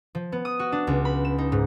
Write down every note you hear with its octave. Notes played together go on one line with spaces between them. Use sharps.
F3
B3
D#6
F#4
D4
C#2
B5
E7
D#4
G#2